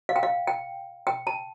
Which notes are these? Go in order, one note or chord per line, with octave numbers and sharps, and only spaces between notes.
F5
G5
F5
G5
G5
A5